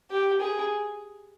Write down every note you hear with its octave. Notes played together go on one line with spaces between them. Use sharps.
G4
G#4